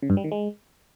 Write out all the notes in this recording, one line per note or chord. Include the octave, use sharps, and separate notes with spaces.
C#3
G2
G3
D#3
G#3